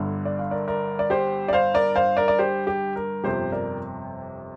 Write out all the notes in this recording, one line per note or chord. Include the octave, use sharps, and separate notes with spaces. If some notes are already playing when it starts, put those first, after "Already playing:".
Already playing: G1 G2 D3
D5
F5
A#4 D5
A#4 D5
D5
G4 C5
D5
C5 F5
A#4 D5
C5 F5
A#4 D5
D5
G4 C5
G4
A#4
G1 F2 C3 G4 C5
A#4 D5